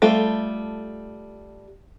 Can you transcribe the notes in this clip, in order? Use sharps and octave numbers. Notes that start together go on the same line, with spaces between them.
G3 A3 F4 A4